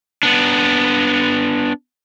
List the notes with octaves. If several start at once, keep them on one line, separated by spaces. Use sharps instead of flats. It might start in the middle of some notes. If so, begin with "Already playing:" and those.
B3 D4